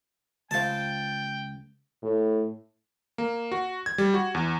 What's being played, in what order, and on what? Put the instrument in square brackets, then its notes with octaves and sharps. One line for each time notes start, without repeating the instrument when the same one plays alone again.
[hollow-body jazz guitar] C#2 F5 [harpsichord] C5 A5 [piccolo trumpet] G5
[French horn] A2
[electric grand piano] A#3
F#4
G#6
G3
F#4
E2